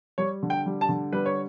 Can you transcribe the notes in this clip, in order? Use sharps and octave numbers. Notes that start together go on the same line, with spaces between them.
G3 C#5
D3
G5
G3
A5
D3
G3 B4
C#5